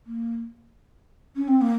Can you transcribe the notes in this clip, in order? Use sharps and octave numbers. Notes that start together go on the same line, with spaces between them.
A#3
C#4
C4
A#3